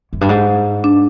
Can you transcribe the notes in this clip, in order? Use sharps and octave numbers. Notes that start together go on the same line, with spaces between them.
F#2
G2
G#2
D4